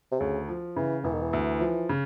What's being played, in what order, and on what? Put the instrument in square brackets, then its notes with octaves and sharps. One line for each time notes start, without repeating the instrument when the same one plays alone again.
[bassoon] C3
[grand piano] D2 [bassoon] C#3
[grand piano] F3
[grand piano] C#3 [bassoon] E3
[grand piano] E1 [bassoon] E3
[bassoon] D#3
E3
[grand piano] D2
F3
C#3